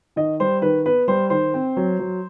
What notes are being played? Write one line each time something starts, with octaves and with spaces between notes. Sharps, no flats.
D#3 D#5
G3 C5
D#3 B4
B3 B4
G3 C5
D#3 C5
C4
F#3
F#3